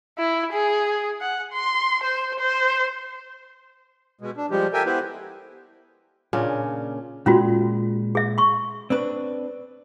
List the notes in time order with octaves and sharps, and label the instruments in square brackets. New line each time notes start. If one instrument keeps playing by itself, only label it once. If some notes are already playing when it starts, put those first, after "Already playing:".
[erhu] E4
G#4
F#5
C6
C5
C5
[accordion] B2 G#3
D4
F3 G3 G#3 G4
G4 A4 A#4 E5 G5 G#5
B3 E4 G4 B4 C5
[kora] A#2 C#3 C#4 D4
[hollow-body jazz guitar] A#2 G#3 [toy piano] C#4 F4 F#4
[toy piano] G#4 E5
C6 C#6
[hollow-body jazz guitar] C4 D4 B4